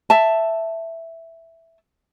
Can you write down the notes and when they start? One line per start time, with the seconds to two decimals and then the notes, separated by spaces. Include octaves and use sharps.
0.10 E5 A5